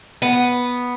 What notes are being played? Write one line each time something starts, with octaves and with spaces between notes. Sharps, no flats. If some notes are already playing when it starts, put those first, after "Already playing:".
B3